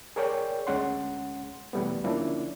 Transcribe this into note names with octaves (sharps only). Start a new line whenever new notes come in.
G#4 A#4 C#5 D5 G5
D2 G#3 C#4 F#5 C6
E2 B2 E3 G3 A3 B3
D3 F3 A#3 C#4 D4 E4